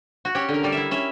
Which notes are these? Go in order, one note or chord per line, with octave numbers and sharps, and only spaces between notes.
F#4
C#4 G4
D3
A#4
G3 D5
E5
E4
C#4 E5